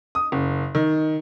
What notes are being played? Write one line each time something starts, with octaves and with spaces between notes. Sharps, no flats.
D#6
F#1
D#3